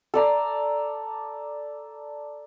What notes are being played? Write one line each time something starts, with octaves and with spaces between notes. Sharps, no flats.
A4 D5 A#5